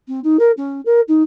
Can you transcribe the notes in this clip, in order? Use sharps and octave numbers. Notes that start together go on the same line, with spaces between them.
C4
D#4
A#4
C#4
A#4
D#4